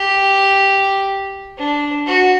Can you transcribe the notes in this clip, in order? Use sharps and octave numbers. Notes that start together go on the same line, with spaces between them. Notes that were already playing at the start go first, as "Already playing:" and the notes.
Already playing: G4
D4
F#4